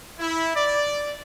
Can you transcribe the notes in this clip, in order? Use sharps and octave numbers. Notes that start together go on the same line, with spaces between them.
E4
D5